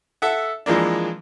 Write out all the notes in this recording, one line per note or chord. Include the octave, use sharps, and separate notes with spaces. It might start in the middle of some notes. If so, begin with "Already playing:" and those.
A4 E5 F#5
E3 F3 G#3 A#3 D4